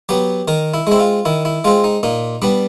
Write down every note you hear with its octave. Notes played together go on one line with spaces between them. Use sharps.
F#3 B3 G4
D#3 A#4
E4
G#3 C4 E4
F4
D#3 E4
E4
G#3 C4 F4
D#4
A#2 D#4
G3 B3 D4